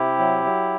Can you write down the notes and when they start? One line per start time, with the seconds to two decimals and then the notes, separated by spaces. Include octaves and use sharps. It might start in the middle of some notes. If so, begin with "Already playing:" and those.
Already playing: C3 E4 G4
0.19 F#3
0.45 F#3